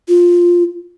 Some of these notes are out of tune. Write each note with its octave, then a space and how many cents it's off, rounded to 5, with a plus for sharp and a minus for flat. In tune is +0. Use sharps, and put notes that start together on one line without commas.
F4 +5